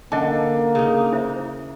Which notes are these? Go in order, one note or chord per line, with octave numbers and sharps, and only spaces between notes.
D3 A#3 C#4 D#5 A5
C#3 D#4
E4 C5 E5